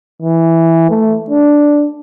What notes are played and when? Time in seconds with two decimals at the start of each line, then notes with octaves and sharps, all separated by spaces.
0.22 E3
0.90 A3
1.30 D4